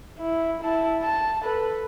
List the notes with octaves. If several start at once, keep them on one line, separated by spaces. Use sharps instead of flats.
E4
E4 A5
A5
A4 B4